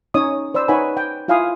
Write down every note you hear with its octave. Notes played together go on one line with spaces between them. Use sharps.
C#4 D#4 C#5 D#5 D#6
C5 D5 B5 E6
D#4 B4 C#5 F#5 G#5 B5
G5
E4 F4 F5 G#5 B5 D#6